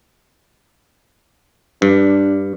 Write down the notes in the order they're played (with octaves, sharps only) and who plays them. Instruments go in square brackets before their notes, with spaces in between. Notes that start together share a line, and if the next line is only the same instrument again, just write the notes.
[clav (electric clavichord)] G2 [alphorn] D4